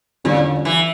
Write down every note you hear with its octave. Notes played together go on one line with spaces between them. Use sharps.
E2 A#2 D3 G3 C#4 F4
E3